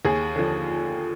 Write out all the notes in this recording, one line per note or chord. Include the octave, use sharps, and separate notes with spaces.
D#2 G#4
D3 F3